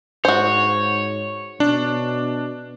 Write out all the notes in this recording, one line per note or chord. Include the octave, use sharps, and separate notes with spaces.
G#2 F#4 C5 C#5
B2 D4